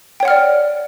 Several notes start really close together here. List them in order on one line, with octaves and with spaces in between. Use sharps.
G5 C#5 F#5 F6 D5